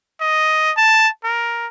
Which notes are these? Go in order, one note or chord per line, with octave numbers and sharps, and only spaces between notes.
D#5
A5
A#4